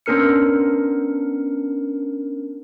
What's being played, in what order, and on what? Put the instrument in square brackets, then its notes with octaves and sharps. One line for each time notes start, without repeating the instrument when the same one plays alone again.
[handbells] B3 C#4 D4 A#4 F6 C#7